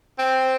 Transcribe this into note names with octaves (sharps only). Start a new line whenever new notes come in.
C4